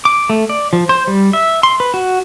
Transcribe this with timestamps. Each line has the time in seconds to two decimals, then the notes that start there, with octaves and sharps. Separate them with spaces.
0.05 D6
0.30 A3
0.49 D5
0.73 F3
0.89 C5
1.07 G3
1.33 E5
1.63 C6
1.80 B4
1.94 F#4